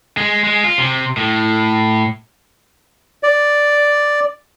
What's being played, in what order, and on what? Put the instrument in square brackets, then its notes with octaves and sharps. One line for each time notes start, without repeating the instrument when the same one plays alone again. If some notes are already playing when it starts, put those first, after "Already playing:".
[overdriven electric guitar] G#3
G#3
F4
C3
A2
[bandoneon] D5